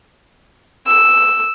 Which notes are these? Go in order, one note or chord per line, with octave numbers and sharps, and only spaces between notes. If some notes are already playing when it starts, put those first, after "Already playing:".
E6